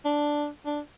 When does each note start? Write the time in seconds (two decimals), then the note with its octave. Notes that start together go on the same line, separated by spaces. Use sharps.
0.05 D4
0.66 D4